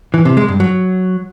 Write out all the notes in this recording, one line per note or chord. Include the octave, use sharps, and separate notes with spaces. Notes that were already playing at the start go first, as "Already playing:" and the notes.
E3
C3
G#3
G2
F#3